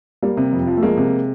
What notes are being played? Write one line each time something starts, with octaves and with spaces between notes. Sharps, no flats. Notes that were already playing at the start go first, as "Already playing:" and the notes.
G3 A#3
C3
F2
F3
A3
G#3 A#3
C3